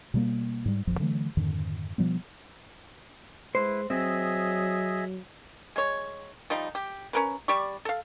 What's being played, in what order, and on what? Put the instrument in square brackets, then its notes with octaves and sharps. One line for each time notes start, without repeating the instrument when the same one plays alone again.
[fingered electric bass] B2 G3 A#3
G#2 G3
D1 A1 F2 F3
D3 E3 F#3 A3
F2 G#2 D3 D#3
B2 F3 G3 B3
[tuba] G#3 [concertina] E4 B4 [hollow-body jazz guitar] C5
[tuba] F#3 [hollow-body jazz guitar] C4 [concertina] G#4 D#5 E5
[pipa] G#3 C#5
F3 G3 D#4
G4
C#4 A#4 B4
G3 G4 D5 C#6
A4 F5